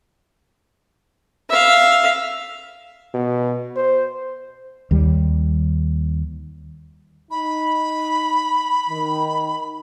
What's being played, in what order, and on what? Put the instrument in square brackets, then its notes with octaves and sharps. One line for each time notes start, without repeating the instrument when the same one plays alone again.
[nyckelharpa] E5 F5
[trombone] B2
C5
[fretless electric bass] D#2 G3
[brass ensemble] D#4 [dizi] B5
[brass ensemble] D#3